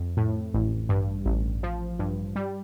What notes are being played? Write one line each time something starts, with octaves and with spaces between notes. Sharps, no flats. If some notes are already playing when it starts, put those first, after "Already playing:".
Already playing: F2
A2
A1
G2
A1
F3
G2
G3